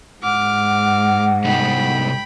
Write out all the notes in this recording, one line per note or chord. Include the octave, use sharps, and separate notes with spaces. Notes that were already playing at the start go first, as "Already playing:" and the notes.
G#2 F#5 D6 F6
C3 G3 D#4 G5 B5